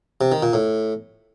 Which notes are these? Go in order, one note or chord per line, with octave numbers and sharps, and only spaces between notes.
C3
D#3
A#2
A2